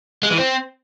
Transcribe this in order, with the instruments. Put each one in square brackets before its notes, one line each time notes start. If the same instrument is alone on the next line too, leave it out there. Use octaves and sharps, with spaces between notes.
[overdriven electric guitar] G#3
E3
C4